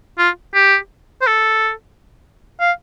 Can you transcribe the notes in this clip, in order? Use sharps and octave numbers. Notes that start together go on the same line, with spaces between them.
F4
G4
C5
A4
F5